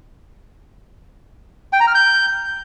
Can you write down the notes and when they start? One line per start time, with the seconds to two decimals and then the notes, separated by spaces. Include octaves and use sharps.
1.73 G5
1.80 A#5
1.87 F6
1.95 G6